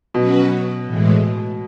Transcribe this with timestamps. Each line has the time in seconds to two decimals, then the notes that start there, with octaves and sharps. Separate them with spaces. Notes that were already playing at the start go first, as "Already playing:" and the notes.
0.14 B2 F#3 C#4 F#4 B4
0.85 A2 E3 G#3